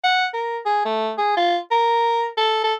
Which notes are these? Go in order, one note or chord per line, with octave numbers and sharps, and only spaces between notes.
F#5
A#4
G#4
A3
G#4
F4
A#4
A4
A4